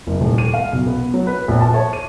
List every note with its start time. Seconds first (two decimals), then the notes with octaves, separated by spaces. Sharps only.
0.07 F#1
0.21 D#1
0.38 D#7
0.54 F5
0.73 B1
0.86 B3
1.14 F#3
1.27 B4
1.48 A#1
1.61 A5
1.74 C#5
1.93 D#7